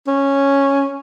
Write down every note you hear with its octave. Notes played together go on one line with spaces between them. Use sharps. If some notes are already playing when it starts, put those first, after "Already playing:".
C#4